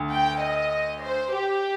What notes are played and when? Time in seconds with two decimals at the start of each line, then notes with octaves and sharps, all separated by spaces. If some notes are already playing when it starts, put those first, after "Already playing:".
Already playing: D2
0.12 G5
0.43 D#5
1.03 C5
1.33 G4